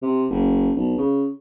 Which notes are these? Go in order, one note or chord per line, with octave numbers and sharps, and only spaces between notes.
C3
F#1
B1
C#3